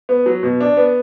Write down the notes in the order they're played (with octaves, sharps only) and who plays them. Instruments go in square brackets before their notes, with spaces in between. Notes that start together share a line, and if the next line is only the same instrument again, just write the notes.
[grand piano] B3
F#3
B2
D4
B3